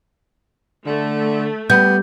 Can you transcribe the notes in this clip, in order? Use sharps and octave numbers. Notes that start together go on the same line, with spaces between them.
D3 A3
G3 B3 G6